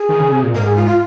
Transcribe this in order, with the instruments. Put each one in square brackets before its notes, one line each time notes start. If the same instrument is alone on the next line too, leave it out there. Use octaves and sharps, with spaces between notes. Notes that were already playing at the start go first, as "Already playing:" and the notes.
Already playing: [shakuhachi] G#4
[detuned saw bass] D#3
C#3
C3
A#2
[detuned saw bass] G#2 [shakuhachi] A#4
[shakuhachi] G#4
F4
F4